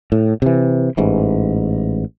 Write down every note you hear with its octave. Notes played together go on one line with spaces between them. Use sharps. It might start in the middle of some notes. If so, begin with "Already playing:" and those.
A2
C3 E3
A1 G#2 E3